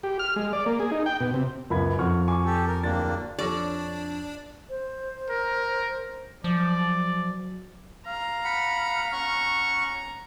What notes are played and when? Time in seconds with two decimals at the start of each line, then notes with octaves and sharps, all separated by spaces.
0.03 G4
0.19 F6
0.36 G#3
0.53 D5
0.66 A#3
0.80 G#4
0.92 D#4
1.06 G5
1.20 B2
1.34 C3
1.70 C#2 F#2 B3 B5 G#6
1.99 F2 F#5 C#6 F6
2.28 G#5 C#6 D6
2.45 G4 A4
2.67 A#4
2.83 D1 A#3 D4 A6
3.39 F2 D4 G4 A4 C#5 D5 C#6 A#6
4.70 C5
5.30 A#4
6.44 F3 F#3 D5
8.07 F5 A#5
8.45 F#5 B5
9.13 C#4 F#5 C#6